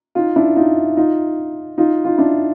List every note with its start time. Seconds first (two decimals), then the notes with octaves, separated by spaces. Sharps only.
0.15 D#4 F4
0.36 D4 E4
0.56 D#4 F4
0.97 D#4 F4
1.78 D#4 F4
2.05 D#4 F4
2.18 D4 E4